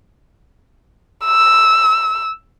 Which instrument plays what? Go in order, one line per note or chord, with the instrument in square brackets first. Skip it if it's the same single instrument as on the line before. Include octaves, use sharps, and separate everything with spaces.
[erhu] E6